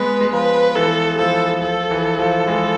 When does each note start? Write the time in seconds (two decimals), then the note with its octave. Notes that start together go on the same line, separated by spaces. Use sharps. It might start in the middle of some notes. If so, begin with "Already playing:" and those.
Already playing: G#3 B3 B4
0.21 G#3
0.33 F3 B4
0.76 E3 A4
1.18 F3 A4
1.62 F3 A4
1.91 E3
2.19 F3
2.47 E3 G#3